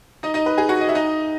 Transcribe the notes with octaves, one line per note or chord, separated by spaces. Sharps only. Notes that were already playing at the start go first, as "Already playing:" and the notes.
D#4 D#5
D#4 D#5
B4
G#4 G#5
F#4 F#5
D#5
E5
D#4 D#5